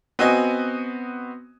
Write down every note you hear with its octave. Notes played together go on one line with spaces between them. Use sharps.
B3 C4 F#4 D#5 G#5